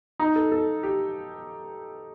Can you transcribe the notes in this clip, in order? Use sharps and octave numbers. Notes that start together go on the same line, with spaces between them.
D#4
A4
A4
G4